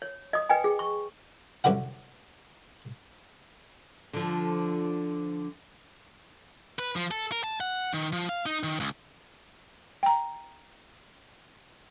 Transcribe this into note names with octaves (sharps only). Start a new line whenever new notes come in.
C#5
D#5 D#6
B4 D#5 G5 G#5
G#4
C#6
C2 F#2 D3 D4 E4 F#5
D3 F3
B4
F3
A4
A#4
A5
F#5
D#3
F3
F5
D#4
D#3
C#2
G5 A#5